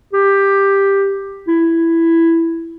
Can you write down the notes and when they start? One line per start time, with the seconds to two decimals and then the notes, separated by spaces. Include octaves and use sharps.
0.13 G4
1.48 E4